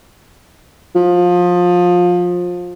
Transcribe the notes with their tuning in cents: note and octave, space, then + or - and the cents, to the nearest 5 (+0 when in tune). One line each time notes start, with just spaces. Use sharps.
F3 +25